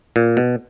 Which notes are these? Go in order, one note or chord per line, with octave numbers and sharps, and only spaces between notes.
A#2
B2